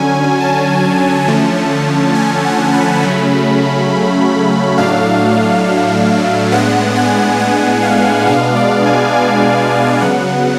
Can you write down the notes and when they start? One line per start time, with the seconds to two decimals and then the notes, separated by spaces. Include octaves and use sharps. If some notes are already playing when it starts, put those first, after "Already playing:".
Already playing: D3 F#3 C#4 G#5
0.40 A5
1.28 D3 F3 A3 C#4
2.15 G#5
2.45 F#5
2.74 B5
3.02 C#3 F#3 A3 C#4
4.78 A2 F#3 A3 D4 F5
6.51 A2 G#3 B3 D4 F#5
6.96 G#5
7.40 F#5
7.82 F5
8.27 B2 G#3 B3 D4 F5
8.56 D5
8.86 G#5
9.15 G#5
10.01 C#3 F#3 B3 F#5